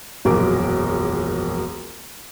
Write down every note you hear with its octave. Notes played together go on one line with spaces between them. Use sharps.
E1 A#1 F#2 A#4 D6